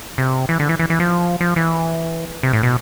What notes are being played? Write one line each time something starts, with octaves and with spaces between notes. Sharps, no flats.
C3
E3
D3
E3
E3
E3
F3
F3
E3
C3
A2
B2